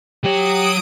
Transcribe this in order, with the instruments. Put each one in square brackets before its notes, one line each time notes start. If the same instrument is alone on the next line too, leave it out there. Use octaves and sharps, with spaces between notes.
[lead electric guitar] F#3 C#5 [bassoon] G4 [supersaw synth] D#6 D7